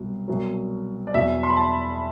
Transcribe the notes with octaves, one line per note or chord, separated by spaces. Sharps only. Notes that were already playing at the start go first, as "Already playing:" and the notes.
Already playing: C2 B2 F#3
C2 B2 F#3
D5
E2 B2 F#3 E5
C6
B5
A5